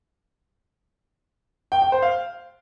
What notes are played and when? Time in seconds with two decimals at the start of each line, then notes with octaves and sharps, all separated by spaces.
1.72 G5
1.82 G5
1.92 C5
2.02 F5